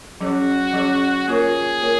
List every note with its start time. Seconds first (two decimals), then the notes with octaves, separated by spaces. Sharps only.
0.20 F#3 C#4 F#4 G#4 C#5
0.73 F#3 C#4 G#4 C#5
1.28 A#3 F4 G#4 A#4 C#5
1.81 A#3 F4 A#4 C#5